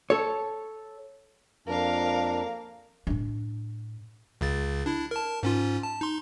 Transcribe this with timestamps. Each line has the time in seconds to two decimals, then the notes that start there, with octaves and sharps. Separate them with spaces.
0.10 A4 C#5
1.67 F2 A#3 D4 A#4 F5
3.07 A2 D4
4.41 C#2 C#3 A6
4.86 D4 E4
5.11 A#4 A5
5.43 G#2 C#4 F4
5.83 A5
6.01 D#4 C6